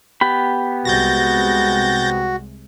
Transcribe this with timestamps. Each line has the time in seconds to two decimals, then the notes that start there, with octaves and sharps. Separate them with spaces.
0.21 B3 G4 B5
0.85 C2 C3 G#3 F#4 G6 A6 A#6